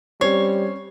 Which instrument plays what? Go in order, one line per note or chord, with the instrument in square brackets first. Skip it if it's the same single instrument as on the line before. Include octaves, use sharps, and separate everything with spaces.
[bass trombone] G3 [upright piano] C4 C#4 C7 [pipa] C#5